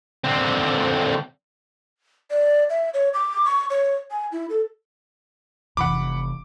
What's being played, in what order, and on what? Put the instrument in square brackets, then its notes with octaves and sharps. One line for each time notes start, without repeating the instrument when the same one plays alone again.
[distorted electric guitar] D3 C4
[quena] D5
E5
C#5
D6
C#6
C#5
G#5
E4
A4
[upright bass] F1 E3 [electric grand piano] F#5 B5 D6